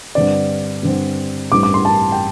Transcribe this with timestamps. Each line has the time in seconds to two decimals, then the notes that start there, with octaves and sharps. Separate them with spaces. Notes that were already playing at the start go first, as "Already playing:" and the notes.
0.15 G2 D3 C4 D5
0.83 G2 D3 C4
1.52 A1 G2 G3 C4 D6
1.63 D6
1.74 C6
1.85 A5
2.12 G5